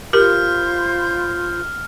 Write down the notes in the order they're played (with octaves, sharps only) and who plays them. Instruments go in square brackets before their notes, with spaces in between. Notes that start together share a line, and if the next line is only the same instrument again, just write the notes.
[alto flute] F4 [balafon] G4 A#4 [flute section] C5 B5 G6 [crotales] F6